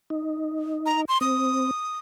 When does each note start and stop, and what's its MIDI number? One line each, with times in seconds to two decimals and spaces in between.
0.10 1.05 63
0.86 1.01 82
1.08 1.18 84
1.21 1.71 60
1.21 1.99 87